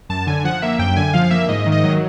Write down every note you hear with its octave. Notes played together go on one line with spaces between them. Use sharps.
F#2 A5
D3 G#5
F3 F#5
A#3 E5
F#2 G5
D3 G#5
F3 F5
A#3 E5
G#2 D#5
D#3
D#5
F#3